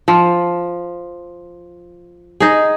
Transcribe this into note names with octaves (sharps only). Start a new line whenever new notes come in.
F3
D#4 G#4